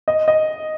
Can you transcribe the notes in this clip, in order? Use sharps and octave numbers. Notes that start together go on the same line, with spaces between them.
D#5
D#5